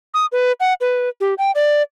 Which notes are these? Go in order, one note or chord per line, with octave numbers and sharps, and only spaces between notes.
D#6
B4
F#5
B4
G4
G5
D5